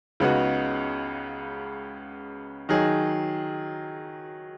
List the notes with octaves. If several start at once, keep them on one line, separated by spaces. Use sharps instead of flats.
C#2 C#3 B3 D#4 F#4
D#3 F#3 D#4 G#4